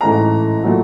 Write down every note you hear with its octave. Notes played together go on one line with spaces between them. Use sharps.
A1 G#2 E3 A3 A#5
A#2 F#3 A3